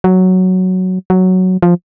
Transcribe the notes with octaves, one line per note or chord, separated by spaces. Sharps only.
F#3
F#3
F3